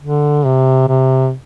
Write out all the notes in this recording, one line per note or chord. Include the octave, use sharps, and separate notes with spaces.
D3
C3
C3